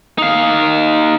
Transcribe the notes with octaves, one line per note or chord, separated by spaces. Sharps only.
D#4 F5